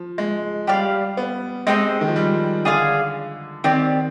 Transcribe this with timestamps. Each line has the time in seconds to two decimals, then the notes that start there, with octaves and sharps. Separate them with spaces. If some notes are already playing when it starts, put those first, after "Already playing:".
Already playing: F3
0.18 G#3
0.67 G3 G4 D5 F5
1.17 B3
1.67 G#3 C4 D#4 G4 C5
2.01 D#3
2.08 F3
2.16 G3
2.65 D3 G#4 D5 F5 G#5
3.64 D#3 C4 G4 D5